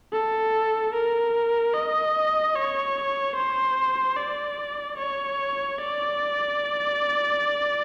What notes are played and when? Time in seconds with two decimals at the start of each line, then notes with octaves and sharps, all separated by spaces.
0.13 A4
0.94 A#4
1.74 D#5
2.55 C#5
3.35 C5
4.17 D5
4.97 C#5
5.78 D5